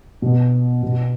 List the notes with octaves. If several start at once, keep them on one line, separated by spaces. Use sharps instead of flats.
B2
B2